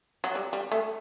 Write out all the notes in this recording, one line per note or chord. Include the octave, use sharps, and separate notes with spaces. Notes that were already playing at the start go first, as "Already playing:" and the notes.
F#3
G3
G3
A3